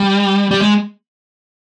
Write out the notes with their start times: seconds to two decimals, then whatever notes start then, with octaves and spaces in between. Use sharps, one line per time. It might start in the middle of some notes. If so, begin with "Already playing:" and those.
Already playing: G3
0.51 G3
0.62 G#3